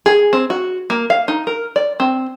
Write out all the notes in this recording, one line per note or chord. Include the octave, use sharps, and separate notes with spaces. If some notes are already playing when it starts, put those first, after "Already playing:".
G#4
C4
F#4
A#3
F5
D#4
A#4
D5
C4